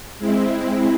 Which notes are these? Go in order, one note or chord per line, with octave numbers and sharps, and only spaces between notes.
G#3 C4 E4